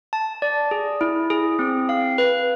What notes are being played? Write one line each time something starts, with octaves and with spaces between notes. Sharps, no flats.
A5
D5
G#4
E4
G#4
C4
F5
B4